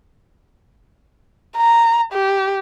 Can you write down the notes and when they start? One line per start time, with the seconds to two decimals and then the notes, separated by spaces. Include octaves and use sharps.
1.57 A#5
2.13 G4